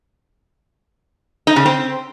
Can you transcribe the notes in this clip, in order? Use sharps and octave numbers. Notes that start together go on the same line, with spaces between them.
D#4
C#3
C4